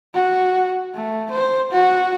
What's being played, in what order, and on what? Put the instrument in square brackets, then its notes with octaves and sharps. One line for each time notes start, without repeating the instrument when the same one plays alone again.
[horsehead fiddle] F#4
A3
C5
F#4